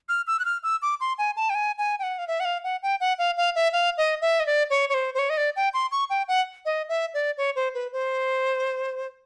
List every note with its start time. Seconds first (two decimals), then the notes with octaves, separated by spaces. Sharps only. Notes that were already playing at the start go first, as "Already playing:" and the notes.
0.09 F6
0.27 E6
0.39 F#6
0.45 F6
0.63 E6
0.82 D6
1.01 C6
1.18 G#5
1.36 A5
1.50 G5
1.55 G#5
1.78 G#5
1.99 G5
2.03 F#5
2.19 F5
2.28 E5
2.40 F#5
2.45 F5
2.64 F#5
2.83 G5
3.01 F#5
3.18 F5
3.37 F5
3.56 E5
3.73 F5
3.98 D#5
4.21 E5
4.40 D#5
4.46 D5
4.70 C#5
4.89 C#5
4.94 C5
5.14 C5
5.19 C#5
5.30 D#5
5.37 D5
5.56 G5
5.74 C6
5.92 C#6
6.10 G5
6.28 F#5
6.65 D#5
6.89 E5
7.14 D5
7.38 C#5
7.56 C5
7.75 B4
7.93 C5